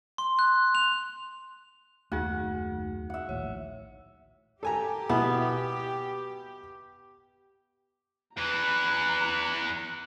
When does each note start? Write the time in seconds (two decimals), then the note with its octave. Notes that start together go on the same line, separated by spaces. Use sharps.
0.18 C6
0.39 F#6
0.75 F7
2.12 F#1 D#2 A3 D#4 F#4 G#4 F#5
3.10 E5 F#5
3.29 A#1 D#2 A2 C#5
4.63 G4 A4 G#5 A#5
5.09 B2 B3 E4 G#4
8.37 E2 E3 A#5 F#6